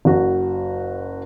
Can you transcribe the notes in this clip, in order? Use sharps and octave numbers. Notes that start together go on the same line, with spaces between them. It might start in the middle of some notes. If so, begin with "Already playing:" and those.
F#1 F#4